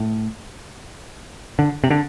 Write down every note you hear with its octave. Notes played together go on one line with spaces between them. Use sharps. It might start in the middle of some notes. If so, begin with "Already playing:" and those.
Already playing: A2
D3
C3
D3